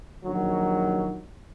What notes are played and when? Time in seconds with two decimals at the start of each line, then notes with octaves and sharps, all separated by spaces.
0.23 A#1 D#3 F#3